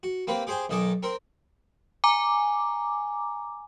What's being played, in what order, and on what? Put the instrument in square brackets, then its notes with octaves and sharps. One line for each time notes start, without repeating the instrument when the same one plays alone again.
[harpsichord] F#4
A#3 C4 G4 B4
G4 G#4 C5 G5 G#5
B1 D#3 D#5 G#5 A5 D6
C4 A#4 C6
[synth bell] G#5 A#5 D6